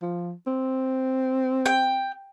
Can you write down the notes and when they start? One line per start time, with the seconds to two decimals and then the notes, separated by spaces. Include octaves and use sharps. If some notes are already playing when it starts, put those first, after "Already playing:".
0.02 F3
0.47 C4
1.66 G5